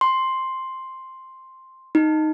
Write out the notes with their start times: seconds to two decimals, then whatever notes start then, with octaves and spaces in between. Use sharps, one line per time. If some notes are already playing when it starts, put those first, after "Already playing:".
0.01 C6
1.95 D#4